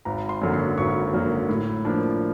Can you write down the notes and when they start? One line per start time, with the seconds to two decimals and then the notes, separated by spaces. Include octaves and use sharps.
0.05 G#1 A#5
0.29 C6
0.42 F#2 D3 F#3 A#3
0.53 C6
0.78 G#1 C#6
1.14 F#2 D3 F#3 A#3
1.49 A2
1.85 F3 A#3 D4 F4